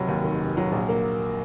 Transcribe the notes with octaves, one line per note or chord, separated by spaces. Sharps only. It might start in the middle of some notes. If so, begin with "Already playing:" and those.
Already playing: F1 F#3
D#2
D#3
F1
F#3
A#1
A#3